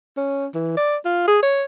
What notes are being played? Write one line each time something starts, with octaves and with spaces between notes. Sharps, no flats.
C#4
E3
D5
F4
G#4
C#5